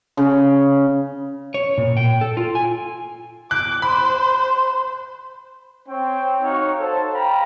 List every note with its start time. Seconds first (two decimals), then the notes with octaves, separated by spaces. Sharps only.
0.17 C#3
1.54 C#5
1.78 A#2
1.97 G5
2.21 A4
2.37 F4
2.55 G#5
3.51 D6 F#6
3.82 C5 B5
5.88 C4 C#5 G5
6.42 D#4 F#4 C#5 F5
6.80 A4 C5 C#5 A5
7.13 F5 G5 A#5 B5